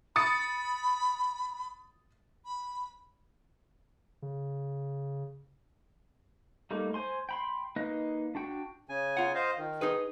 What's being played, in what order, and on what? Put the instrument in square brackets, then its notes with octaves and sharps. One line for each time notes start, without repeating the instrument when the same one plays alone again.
[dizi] B5 [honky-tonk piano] D#6 A6 C#7
[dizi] B5
[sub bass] C#3
[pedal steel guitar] G3 A3 A#3 D#4
C5 G#5 C6
G5 B5 C6
A#3 D#4 B4 D#5
D4 F#4 G5
[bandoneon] C#3 G#5
[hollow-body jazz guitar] F4 F#5
[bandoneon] C5 D#5 F5
D#3
[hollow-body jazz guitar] D#4 G#4 B4